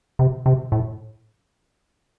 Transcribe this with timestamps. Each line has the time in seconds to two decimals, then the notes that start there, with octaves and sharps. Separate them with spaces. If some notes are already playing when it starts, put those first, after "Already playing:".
0.19 C3
0.46 C3
0.72 A2